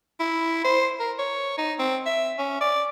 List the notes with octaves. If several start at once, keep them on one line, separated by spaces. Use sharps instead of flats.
E4
C5
A#4
C#5
D#4
C4
E5
C#4
D5